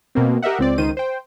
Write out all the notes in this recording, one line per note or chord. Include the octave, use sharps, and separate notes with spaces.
B2 A#3 C4
G4 A#4 D#5 E5 F#5
C#2 C4 D5
C#2 D#3 C5 D#7
C5 G5